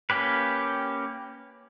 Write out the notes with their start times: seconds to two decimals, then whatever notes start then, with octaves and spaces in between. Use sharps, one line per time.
0.10 A#3 C#4 G4 B4